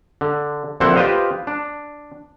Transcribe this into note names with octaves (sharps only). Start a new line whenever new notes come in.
D3
A#1 D3 C4 E4 C5 F#5
F4 G4 B4 C5 D#5 F5
D4